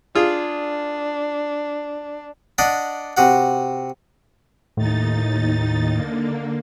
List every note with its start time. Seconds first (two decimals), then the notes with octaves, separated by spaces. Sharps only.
0.15 D4 F4 G#4
2.58 D4 D5 D#5 F#5
3.17 C3 F#4 F#5
4.77 D#2 A2 D#4 A6
5.93 D3 A#3